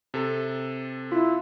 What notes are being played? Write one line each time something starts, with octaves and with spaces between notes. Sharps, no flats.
C3 A4
E4 F4